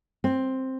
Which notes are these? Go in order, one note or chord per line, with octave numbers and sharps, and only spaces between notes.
C4